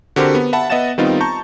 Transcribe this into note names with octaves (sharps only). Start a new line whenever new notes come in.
D3 C4 F#4 G4 A#4 C5
B3
E5 F#5 A5 B5
B3 D#5 E5 F#5 A6 E7
D#3 G3 B3 C4 D#4 F4
A5 A#5 C#6 G6